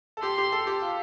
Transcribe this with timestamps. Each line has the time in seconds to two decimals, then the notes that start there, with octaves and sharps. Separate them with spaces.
0.17 A4
0.22 G4 C6
0.38 G4
0.52 A4
0.67 G4
0.82 F4